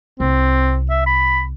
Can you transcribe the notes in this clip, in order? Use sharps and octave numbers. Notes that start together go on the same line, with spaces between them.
C2 C4
E5
B5